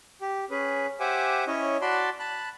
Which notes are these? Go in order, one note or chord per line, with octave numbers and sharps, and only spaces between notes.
G4
C#4 G#4 B4
G4 C5 E5 F#5 G#5 D6
C#4 E4 C#5 D#5
F#4 D5 A5 B5 C6
A5 B5 F#6